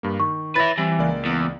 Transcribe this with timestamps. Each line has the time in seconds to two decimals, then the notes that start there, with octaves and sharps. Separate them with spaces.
0.03 G2 A#3
0.20 D#3 C#6
0.56 E4 B4 C#5 E5 B5 A6 A#6
0.78 E3 G3 C4
0.99 C#2 A#3 D5
1.25 E2